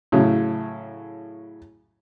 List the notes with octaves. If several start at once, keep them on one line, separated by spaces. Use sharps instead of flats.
A2 C#3 F#3